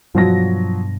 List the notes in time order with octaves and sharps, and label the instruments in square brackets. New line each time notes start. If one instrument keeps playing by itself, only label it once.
[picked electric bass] G2 B2 [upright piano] F3 F#3 A#6